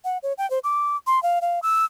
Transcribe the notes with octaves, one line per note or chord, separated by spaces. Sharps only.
F#5
C#5
G5
C5
D6
C6
F5
F5
E6